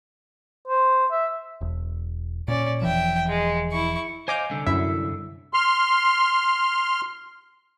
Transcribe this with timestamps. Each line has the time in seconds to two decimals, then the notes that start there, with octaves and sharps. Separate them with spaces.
0.68 C5
1.11 E5
1.61 E1
2.48 A#2 C#4 D5
2.82 E1 E3 F3 E5 G5
3.28 G#3
3.72 E4 C#6
4.28 C5 D#5 F5 G#5 D6 G6
4.50 C2 D3
4.66 F#2 E4 E5
5.54 C6 F6